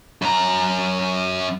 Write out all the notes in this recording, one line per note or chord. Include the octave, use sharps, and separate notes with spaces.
F#2 A#5